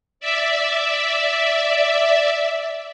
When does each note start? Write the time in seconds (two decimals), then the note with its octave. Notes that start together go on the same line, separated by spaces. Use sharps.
0.20 D5 E5